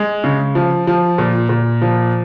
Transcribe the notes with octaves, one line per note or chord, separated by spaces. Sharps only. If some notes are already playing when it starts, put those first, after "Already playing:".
Already playing: G#3
C#3
F3
F3
A#2
A#2
F3